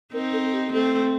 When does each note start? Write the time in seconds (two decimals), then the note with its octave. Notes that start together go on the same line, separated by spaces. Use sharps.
0.13 C4 D#4 A#4
0.32 A4
0.53 G4
0.73 A3 C4 A4